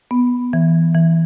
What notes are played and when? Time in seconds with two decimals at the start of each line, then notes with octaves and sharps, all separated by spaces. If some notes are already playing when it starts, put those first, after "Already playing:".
0.11 B3
0.53 E3
0.94 E3